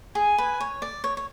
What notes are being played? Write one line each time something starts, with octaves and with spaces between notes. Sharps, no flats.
G#4 G#5
B4
C#5
D5
C#5
C#5